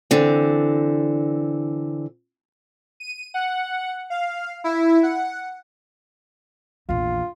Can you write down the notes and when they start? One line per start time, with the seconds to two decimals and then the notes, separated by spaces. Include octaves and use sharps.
0.11 D3 E3 C4
3.00 D#7
3.34 F#5
4.10 F5
4.64 E4
5.03 F#5
6.89 A#1 E2 F4